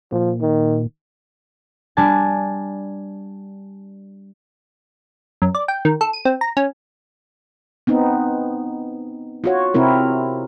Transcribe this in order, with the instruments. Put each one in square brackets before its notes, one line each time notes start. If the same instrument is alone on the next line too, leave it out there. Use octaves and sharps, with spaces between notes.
[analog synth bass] A#2 [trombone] F3
[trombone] D#3
[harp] G3 D4 G#5 A5
[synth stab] F#2
D5
G5
D#3
A4
D#7
C4
A#5
C#4
[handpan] B3 C4 D#4
F4 F#4 C#5
C3 C4 E4 A#4